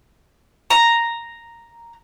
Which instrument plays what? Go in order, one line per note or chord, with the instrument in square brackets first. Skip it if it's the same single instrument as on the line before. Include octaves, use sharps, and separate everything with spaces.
[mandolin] A#5